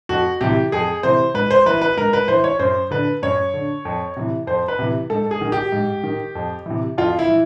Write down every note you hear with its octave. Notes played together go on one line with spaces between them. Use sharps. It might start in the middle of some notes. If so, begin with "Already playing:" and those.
F2 F#4
C3 E3 G4
F2 G#4
C3 E3 C5
G#2 B4
C5
E3 B4
B4
G#2 A#4
B4
E3 C5
C#5
F#2 C5
D3 B4
F#2 C#5
D3
F2
C3 E3
F2 C5
B4
C3 E3
G#2 A4
G#4
D#3
G4
G#2
D#3
F2
C3 E3
F2 F4
E4
E3